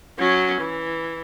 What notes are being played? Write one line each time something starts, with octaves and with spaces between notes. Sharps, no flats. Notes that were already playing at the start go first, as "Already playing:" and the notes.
F#3 C#4
E3